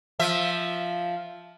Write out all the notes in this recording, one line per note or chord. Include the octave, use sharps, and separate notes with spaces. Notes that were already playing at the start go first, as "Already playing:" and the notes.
F3 E5